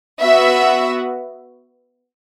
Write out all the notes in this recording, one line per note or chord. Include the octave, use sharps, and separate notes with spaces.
B3 F#4 E5